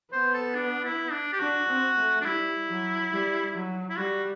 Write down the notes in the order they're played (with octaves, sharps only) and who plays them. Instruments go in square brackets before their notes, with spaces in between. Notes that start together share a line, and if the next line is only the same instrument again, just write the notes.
[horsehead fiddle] B3 [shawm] C5
[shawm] A4
D4
E4
D4
G4
[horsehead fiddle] D4 [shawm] F#4
[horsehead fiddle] C4
A3
[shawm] D4
[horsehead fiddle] G3 [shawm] E4
[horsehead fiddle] F#3
G3
F#3
[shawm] E4
[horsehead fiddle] G3 [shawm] F#4